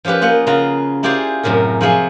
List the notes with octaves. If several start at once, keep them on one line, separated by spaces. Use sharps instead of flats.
F3 C#4 F4 G4 B4
A#3 F4 D#5 F#5
C#3 F4 F#4 A#5
E4 F4 G4 G#4 C5 D5
F#2 A2 C3 C#4 A#4
F3 F4 F#4 G#4 E5 C6